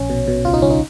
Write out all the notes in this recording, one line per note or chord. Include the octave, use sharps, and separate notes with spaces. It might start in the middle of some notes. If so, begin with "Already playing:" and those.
Already playing: A#1 C#4
B2
B2
C#2 F4
D#4
C#2 C#4
D#4